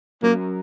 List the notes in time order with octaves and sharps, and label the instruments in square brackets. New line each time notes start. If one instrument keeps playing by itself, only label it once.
[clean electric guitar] F#3 C#4 F#4 A#4 [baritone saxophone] A#3